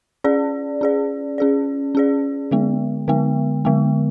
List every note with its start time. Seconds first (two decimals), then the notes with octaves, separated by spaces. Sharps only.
0.24 C#4 G#4 D5
0.81 C#4 G#4 D5
1.38 C#4 G#4 D5
1.95 C#4 G#4 D5
2.51 D3 G#3 B3
3.08 D3 G#3 B3
3.65 D3 G#3 B3